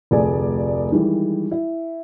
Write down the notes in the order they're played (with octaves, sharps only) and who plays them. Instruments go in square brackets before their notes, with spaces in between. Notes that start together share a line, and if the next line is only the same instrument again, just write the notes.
[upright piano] F1 D2 G#4 A4 D5 G#5
D#3 E3 G3 G#3
E4